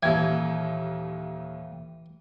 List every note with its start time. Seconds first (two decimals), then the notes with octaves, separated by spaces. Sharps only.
0.03 D#1 D#2 E3 E5 F5 G5 G#6